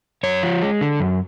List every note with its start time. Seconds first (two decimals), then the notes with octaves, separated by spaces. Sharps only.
0.23 F#2 C#5
0.43 F3
0.62 G#3
0.81 D3
1.00 F#2